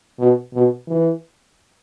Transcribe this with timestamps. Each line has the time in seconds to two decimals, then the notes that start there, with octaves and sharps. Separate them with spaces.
0.19 B2
0.53 B2
0.87 E3